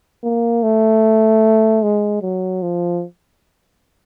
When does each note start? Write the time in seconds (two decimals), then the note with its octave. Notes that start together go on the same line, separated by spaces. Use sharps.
0.24 A#3
0.63 A3
1.83 G#3
2.22 F#3
2.62 F3